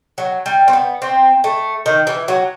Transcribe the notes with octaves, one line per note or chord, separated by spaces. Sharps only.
F#3
G3
C4
B3
C4
A3
D#3
E3
F#3